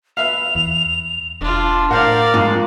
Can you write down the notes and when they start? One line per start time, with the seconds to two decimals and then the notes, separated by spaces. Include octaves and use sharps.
0.17 B4 E5 F5 F7
0.55 E2
1.41 E1 D4 F4
1.91 A2 D4 A#4 C5 D5 F5 F#5
2.34 F2 G#2 F4